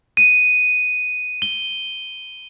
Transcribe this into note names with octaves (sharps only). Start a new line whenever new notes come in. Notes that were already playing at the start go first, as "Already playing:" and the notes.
D#7
G7